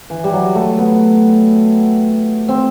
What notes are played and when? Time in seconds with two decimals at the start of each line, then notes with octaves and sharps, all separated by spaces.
0.10 E3
0.24 G3
0.33 F#3
0.55 A3
0.79 B3
2.48 C4